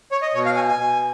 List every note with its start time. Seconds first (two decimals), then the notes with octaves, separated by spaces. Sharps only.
0.11 C#5
0.22 D#5
0.34 B2 C#5
0.46 F5
0.56 G#5
0.68 G#5
0.79 B2